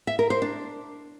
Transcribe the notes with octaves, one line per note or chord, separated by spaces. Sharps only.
E5
A#4
C5
D4